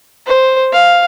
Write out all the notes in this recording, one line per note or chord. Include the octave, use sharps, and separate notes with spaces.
C5
F5